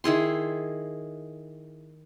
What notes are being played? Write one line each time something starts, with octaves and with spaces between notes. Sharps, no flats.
D#3 E4 G#4 C6